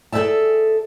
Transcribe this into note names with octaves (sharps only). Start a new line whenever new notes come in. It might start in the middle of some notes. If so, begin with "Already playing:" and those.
G#4 A4 C5 D5 E5 A5